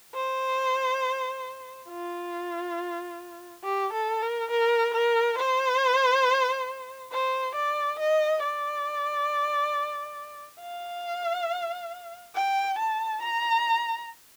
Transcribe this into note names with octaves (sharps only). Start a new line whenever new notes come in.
C5
F4
G4
A4
A#4
A#4
A#4
C5
C5
D5
D#5
D5
F5
G5
A5
A#5